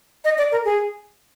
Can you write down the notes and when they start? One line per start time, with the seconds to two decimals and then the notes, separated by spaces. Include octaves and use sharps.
0.25 D#5
0.38 D5
0.52 A#4
0.65 G#4